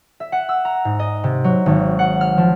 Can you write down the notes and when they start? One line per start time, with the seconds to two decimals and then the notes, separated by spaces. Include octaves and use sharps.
0.20 E5
0.32 F#5
0.49 E6
0.65 A#5
0.85 G#2
0.99 D#5
1.24 C3
1.44 F#3
1.66 G#1
1.99 F#5
2.21 F6
2.37 F3